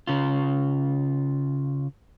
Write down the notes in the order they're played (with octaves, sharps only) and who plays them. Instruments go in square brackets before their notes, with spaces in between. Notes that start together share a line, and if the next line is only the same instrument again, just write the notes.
[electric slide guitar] C#3 F4